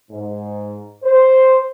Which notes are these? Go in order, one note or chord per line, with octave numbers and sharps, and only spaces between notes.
G#2
C5